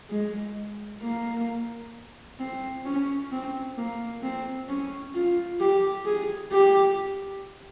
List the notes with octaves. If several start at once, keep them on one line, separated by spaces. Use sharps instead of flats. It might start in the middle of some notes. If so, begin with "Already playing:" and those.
G#3
A#3
C4
C#4
C4
A#3
C4
C#4
F4
G4
G#4
G4